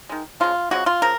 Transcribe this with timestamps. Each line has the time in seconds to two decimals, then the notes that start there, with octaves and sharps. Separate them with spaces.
0.09 D#3 G#3
0.40 C#3 F3 G#3 F4
0.71 C#3 F3 G#3 F#4
0.86 F4
1.02 C#3 F3 A#4